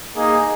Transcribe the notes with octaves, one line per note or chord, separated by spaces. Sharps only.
A#3 D#4 G#4 D#5